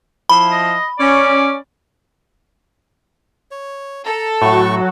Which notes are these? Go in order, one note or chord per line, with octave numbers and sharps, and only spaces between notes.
F3 E4 B5
D#5
C#4 D5
C#5
A4 A#5
A2 F#3 A3 F#4 C#6